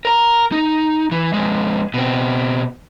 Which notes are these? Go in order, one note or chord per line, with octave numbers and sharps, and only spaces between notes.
A#4 A#5
D#4
E3
F2 G#3
B2 C4